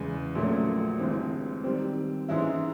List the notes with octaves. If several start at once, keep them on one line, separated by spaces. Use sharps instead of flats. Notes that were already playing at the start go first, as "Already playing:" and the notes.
Already playing: E2 C#3 E3 G#3
A#1 A#2 F#3 A3 C#4
G1 G2 E3 G#3 C4
D#3 G3 C4
G#2 E3 G#3 C#4 E4